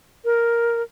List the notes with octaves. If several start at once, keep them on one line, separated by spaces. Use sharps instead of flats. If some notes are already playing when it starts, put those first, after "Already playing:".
A#4